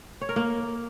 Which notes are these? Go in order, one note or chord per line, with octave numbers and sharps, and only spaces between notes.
C#5
A#4
A#3